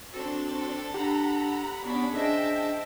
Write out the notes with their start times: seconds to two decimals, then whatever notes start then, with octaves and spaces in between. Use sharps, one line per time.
0.13 C4 D4 F#4 A4
0.94 D4 G4 F#5 A#5 B5
1.84 B3 C#4 D4 F#4 D5 B5
2.14 D4 G#4 C5 D#5 E5 G5 A5